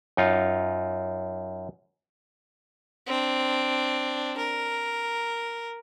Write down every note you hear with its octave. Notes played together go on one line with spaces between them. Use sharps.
F#2 D#4 F4
C4 D4
A#4